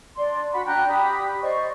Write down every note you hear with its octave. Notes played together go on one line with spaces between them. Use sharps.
D4 D5 C6
F#4 F#5 B5
D4 G5 A#5 F#6
G4 B5 D#6
C5 D5 D#5 C#6